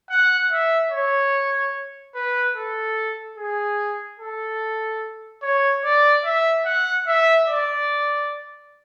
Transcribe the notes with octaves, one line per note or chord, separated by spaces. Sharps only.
F#5
E5
C#5
B4
A4
G#4
A4
C#5
D5
E5
F#5
E5
D5